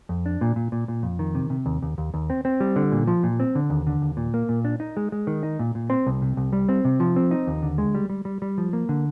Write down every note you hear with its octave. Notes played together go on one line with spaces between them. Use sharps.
F2
D4
A#2
A#2
A#2
A#2
F2
D#3
C3
C3
D#2
D#2
D#2
D#2
C4
C4
G3
D3
A#2
F3
A#2
C4
D3
D#2
D3
D#2
A#2
A#3
A#2
D4
D#4
G#3
G#3
D#3
D#4
A#2
A#2
C4
C2
C3
C2
G3
C4
C3
F3
C4
D#4
D#2
D3
G#3
G3
G3
G3
G3
F3
A#3
D3